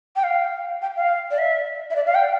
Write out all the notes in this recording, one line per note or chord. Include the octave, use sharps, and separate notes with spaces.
G5
F5
G5
F5
D5
E5
E5
D5
F5
G5